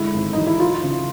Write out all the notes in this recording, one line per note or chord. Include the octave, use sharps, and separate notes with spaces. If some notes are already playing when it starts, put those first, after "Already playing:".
Already playing: D3 G#3 E4
G#1
E3 D#4
E4
F#3 F4
C#3